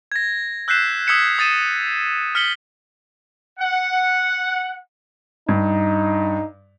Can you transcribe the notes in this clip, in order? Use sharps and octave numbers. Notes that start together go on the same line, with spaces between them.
G#6 A#6
E6 F#6 G6 B6 C7 E7
D#6 E6 G#6 B6 C#7 E7
D#6 A6 D#7 E7
F6 B6 C#7 F#7 G7
F#5
G2 D#4